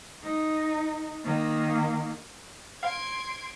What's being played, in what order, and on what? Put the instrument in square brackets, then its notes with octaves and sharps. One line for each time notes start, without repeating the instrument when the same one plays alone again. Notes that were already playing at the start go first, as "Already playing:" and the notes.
[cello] D#4
D#3 A#3
[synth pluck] F5 [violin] C6 [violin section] G#6 D7